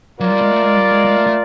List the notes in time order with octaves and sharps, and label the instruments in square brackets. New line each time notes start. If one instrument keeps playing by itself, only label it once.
[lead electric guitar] F#3 [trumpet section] F4 A#4 D5
[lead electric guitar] G3
G#3
A3
G#3
G3
G#3
G#3
A3
A3